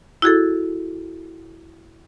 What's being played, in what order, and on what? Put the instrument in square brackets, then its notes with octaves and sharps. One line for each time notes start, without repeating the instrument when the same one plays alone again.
[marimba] E4 F#4 G#4 A4